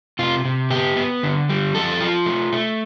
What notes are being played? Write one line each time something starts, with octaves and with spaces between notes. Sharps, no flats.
C3 F4
C3
B3 G4
B3
D3
G3
F3 A4
F4
A3
A3